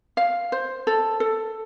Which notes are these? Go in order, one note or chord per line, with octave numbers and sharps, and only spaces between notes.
F5
C5
A4
A4